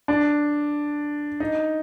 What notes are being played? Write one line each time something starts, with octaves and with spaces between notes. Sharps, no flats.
D4
D#4